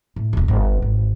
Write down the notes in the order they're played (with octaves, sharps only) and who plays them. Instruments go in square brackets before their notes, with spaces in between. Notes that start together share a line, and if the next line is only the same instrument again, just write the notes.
[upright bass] A2
D#1 D3
G1
G#1